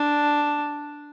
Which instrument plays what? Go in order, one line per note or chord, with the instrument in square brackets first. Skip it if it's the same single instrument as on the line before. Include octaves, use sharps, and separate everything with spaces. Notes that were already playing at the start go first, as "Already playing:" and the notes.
Already playing: [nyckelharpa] D4